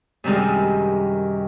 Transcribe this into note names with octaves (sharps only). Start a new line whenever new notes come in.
F#2 C3 D#3 G3 G#3